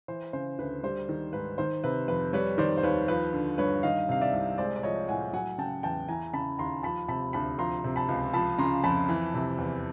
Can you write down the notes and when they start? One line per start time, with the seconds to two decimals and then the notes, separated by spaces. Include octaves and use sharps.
0.08 E3 C5
0.33 C#3 C5
0.59 D2 B4
0.83 G3 C5
1.09 D#3
1.33 G#2 B4
1.58 D#3 C5
1.84 C3 B4
2.08 F2 B4
2.33 G3 B4 C#5
2.58 D#3 C5 D5
2.77 C5
2.83 D#2 B4 C#5
3.08 F3 B4
3.33 D3
3.58 G2 B4 C#5
3.83 D#3 D#5 F5
4.09 C3 F5
4.21 D5 E5
4.34 C2
4.58 G#3 C5 D5
4.76 D5
4.83 F3 C#5 D#5
5.08 A2 F#5 G#5
5.33 F#3 F#5 G#5
5.58 C#3 G5 A5
5.83 E2 G5 A5
6.08 E3 G#5 A#5
6.33 C#3 A5 B5
6.59 D#2 A#5 C6
6.83 F3 A5 B5
7.08 C3 A5 B5
7.33 D2 A5 B5
7.58 F3 A#5 C6
7.84 C3
7.96 A5 B5
8.09 C#2
8.34 F3 A5 B5
8.58 C#3 A#5 C6
8.84 F2 A5 B5
9.09 E3
9.34 C3
9.58 E2